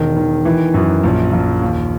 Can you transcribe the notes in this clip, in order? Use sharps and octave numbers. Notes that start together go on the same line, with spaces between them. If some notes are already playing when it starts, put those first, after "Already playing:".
Already playing: E1 D#3
D#3
E3
F#2
A#1
A#1
D#2